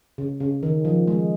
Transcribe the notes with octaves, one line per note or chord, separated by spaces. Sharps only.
C#3
C#3
D#3
F3
G#3